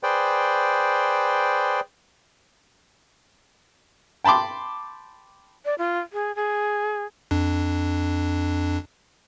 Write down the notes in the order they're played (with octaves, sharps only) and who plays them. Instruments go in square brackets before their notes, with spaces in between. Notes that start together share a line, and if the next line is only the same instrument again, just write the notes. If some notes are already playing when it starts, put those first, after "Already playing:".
[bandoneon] G#4 B4 C5 D5 G5
[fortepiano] G5 A5 B5 C6 D6
[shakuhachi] D5
F4
G#4
G#4
[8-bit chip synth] F2 D4